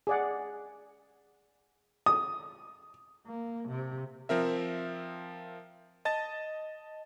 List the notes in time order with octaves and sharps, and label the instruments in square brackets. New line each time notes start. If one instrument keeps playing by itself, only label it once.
[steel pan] G#4 D5 F#5
[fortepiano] D#6
[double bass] A#3
C3
[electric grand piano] F3 C4 A#4 E5
D#5 A5 A6